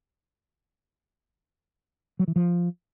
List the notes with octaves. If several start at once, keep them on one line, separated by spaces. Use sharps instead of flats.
F#3
E3
F3